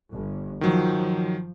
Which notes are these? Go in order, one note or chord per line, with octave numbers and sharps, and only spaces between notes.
G1
D#3 F3 F#3